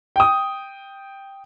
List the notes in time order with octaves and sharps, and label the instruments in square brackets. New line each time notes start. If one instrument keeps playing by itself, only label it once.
[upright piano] G5 D#6